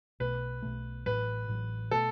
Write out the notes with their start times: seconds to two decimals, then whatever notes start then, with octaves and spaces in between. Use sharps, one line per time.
0.20 B1 B2 A3 B4
0.62 B1 B2 A3
1.06 A1 A2 F#3 B4
1.48 A1 A2 F#3
1.91 B2 A3 A4